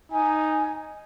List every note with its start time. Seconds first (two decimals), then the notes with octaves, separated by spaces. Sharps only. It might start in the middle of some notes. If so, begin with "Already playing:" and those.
0.12 D#4 G#5